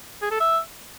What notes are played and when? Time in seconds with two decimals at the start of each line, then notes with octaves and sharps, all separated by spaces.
0.22 G#4
0.31 A4
0.40 E5